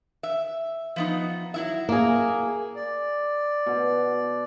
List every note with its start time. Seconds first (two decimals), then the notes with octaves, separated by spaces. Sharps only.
0.23 E5
0.96 F3 B3 D#4
1.54 F#3 E4 E5
1.89 A#3 G#4
2.76 D5
3.66 B2 D6